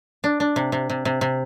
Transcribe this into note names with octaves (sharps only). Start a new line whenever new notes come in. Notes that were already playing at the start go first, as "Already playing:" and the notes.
D4
D4
C3
C3
C3
C3
C3